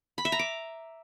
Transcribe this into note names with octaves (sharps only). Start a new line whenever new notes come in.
B5
E5
A#5
D6